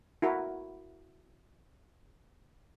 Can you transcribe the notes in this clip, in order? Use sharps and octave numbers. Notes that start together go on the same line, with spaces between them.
E4 F#4 A#4